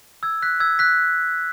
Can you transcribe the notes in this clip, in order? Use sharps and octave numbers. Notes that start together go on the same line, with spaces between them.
E6 G#6
F#6 B6
E6 G#6
F#6 B6